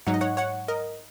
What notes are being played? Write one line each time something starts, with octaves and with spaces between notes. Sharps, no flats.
G#2 F#3 D#4 F#5
D#5
C#5 F#5
C#5 F#5
A#4 D#5